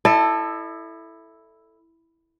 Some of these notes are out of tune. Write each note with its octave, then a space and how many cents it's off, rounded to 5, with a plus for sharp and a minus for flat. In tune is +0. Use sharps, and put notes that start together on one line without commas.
E4 +0 A4 +5 D#5 -45